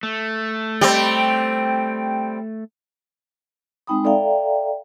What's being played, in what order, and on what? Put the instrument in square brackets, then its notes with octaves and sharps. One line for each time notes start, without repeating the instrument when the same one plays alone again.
[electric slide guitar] A3
[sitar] G3 C4
[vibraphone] G#3 C4 D#4 G5 B5 D#6
A4 D5 E5 F5 G5 A#5